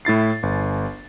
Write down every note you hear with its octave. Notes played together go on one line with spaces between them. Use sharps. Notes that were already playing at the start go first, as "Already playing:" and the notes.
A2 E4 A6 C7
G1